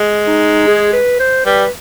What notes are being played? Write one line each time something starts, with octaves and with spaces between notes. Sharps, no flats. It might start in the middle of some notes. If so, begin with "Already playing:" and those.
Already playing: G#3
D#4
G#4
B4
C5
G3 B4